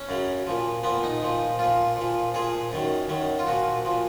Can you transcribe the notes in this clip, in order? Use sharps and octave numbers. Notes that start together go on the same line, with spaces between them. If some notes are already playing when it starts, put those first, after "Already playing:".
Already playing: C#4
F#2 C#3 F#3
A#2 F3
A#2 F3 B3
D#4
A#2 F3
A#2 F3 F4
A#2
F3
A#2 F3 G#4
F#2 D#3 F#3
F#2 D#3 F#3
F4
A#2 F3 F#4
A#2 F3